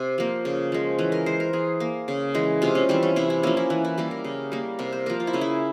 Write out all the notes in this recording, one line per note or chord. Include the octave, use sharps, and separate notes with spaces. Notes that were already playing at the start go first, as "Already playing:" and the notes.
Already playing: C3
F3 A#3
C#3
F3 G#3
E3 C#4
A#4
G#3 C5
A#4
E3 G#4
A#3
C#3
E3 G#3
C3 F4
C#4
E3 G3 C4
C#4
C3 E4
E4
F3 A#3 C#4
E4
E3 E4
E4
G3 A#3 G4
A#4
C#3
G3 A#3
C3 A#4
C5
F3 A#3 A#4
F4
E4
C#3 C#4
E4